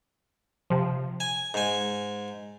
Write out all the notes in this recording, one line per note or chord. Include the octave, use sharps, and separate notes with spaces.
C3 F3
G#5
G#2 G#5